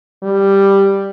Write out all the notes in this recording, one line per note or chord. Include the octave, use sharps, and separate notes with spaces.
G3